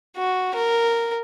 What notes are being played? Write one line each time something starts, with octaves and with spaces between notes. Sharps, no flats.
F#4
A#4